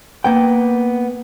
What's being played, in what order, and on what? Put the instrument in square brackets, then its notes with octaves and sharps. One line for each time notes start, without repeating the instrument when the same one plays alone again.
[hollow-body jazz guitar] A#3 B3 G5